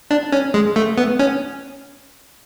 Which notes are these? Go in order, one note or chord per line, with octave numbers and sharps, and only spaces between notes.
D4
C#4
G#3
A3
B3
C#4